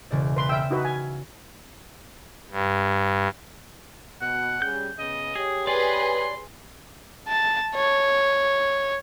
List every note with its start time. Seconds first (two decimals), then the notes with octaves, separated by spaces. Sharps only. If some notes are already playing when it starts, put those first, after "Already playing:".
0.11 E1 C#3 D5
0.36 B4 C6
0.49 E5 G5 E6 F6
0.71 D#4 F#4 B4
0.85 G#5
2.50 G2
4.22 B2 F#5
4.62 G3 C#4 G#4 G6
4.99 C#3 B3 D#5
5.35 G4 G#4 C#5
5.67 G#4 B4 D5 C6
7.28 A5
7.75 C#5